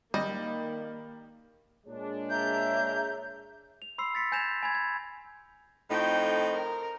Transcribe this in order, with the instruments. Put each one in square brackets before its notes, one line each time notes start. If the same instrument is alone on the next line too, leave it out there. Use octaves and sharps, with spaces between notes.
[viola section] D#3 A#3 [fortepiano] G3 [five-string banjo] D#5
[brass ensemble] A#2 G#3 D4 [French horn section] G#4 C#5
[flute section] E5 A#5 [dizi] G6
[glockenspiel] F7
B5 C6 E6 C7
B5 A6 B6 C#7
G#5 G6 G#6 A#6 E7 F7
G#5 B5 G#6
G#6
[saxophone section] F2 A2 D#4 [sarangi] G5
[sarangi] A#4